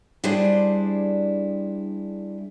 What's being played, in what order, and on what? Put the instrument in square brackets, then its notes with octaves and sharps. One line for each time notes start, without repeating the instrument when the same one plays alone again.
[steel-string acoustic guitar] G3 D4 E4 G#4 C5 D5